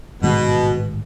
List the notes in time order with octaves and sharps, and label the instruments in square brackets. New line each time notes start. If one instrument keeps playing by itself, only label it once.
[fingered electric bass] A1 G#2 D#3 G#3 [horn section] B2